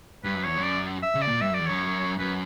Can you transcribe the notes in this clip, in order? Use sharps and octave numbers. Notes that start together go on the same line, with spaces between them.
G2 B4
F#2
E2 C#5
F#2
D5
E5
C#3
D5
A#2
G2 E5
F#2 D5
E2
F#2 C#5
F#2 B4